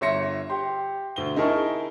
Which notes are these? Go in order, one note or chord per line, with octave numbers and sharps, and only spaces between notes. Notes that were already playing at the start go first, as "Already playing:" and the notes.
G1 C#5 E5 C6 A#6 C#7
G4 C6
D2 G7
D#4 E4 G#4 A#4 A5 C#6